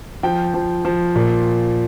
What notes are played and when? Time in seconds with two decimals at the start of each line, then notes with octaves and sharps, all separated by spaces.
0.23 F3 G5
0.54 F3
0.85 F3
1.16 A#2